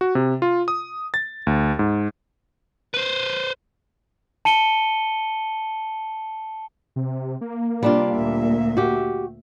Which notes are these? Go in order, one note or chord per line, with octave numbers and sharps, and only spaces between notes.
F#4
C3
F4
D#6
A6
D2
G#2
B4 C5
A5 C#7 D#7 G7
C3
A#3
C3 G3 D4 F4 D5
D2 A#2 E5
F#4 G4